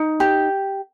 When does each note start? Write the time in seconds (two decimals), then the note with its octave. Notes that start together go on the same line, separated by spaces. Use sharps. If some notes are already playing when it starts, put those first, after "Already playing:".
Already playing: D#4
0.20 G4